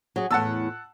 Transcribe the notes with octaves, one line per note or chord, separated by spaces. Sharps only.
F#3 G#4
E2 A2 F#5 A5 E6